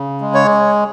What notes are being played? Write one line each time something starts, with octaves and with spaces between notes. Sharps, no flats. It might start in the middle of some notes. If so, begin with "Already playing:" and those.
Already playing: C#3
G#3
C#5